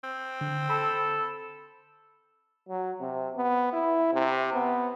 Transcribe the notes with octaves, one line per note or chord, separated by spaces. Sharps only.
C4
D3
A4 B5
F#3
C3
B3
E4
C3
B3